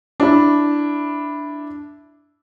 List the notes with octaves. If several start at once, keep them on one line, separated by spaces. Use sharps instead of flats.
D4 E4